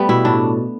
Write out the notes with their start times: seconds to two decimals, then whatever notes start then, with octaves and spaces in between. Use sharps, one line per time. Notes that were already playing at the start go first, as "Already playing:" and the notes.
Already playing: G3 A3 B3
0.09 B2 E4
0.25 A2 D4